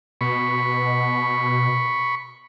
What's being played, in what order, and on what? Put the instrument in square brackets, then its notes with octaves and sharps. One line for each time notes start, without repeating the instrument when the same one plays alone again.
[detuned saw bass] B2 [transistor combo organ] B5 C#6